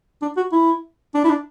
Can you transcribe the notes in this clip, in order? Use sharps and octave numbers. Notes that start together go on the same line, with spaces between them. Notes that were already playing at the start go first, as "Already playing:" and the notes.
D4
F#4
E4
D4
E4
D4